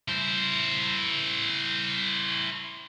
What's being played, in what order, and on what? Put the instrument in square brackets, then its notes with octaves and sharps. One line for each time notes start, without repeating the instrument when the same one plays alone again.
[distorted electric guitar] E4 C5